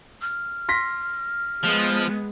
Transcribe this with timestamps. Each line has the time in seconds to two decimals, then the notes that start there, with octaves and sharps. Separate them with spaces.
0.21 F6
0.69 C6 A#6 B6
1.63 F3 G#3 B3